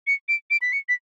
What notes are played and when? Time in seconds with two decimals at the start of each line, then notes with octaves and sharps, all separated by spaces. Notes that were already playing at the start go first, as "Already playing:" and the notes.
0.07 C#7
0.29 D7
0.51 D7
0.62 B6
0.73 C#7
0.89 B6